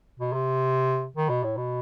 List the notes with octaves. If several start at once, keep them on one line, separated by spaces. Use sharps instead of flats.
B2
C3
D#3
B2
A2
B2